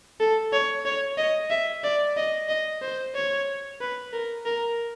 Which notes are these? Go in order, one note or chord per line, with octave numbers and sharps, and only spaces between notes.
A4
C#5
C#5
D#5
E5
D5
D#5
D#5
C5
C#5
B4
A#4
A#4